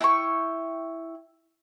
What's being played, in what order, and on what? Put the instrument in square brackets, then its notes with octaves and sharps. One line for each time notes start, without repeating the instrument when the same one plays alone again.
[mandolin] E4 G5 A#5 C#6